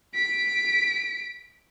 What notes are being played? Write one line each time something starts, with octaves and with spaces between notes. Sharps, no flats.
B6 D7